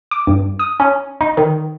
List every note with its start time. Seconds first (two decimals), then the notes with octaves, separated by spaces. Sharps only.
0.11 D6
0.27 G2
0.59 D#6
0.80 C#4
1.21 D#4
1.37 D#3